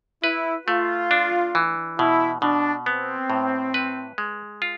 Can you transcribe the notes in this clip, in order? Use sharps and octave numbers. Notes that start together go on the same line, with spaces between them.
E4 B4
A3 F4
D4
E3
B2 E4
B2 D4
B3 C4
A2
B4
G#3
F4